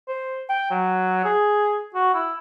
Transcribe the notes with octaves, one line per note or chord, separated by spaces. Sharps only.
C5
G5
F#3
G#4
F#4
E4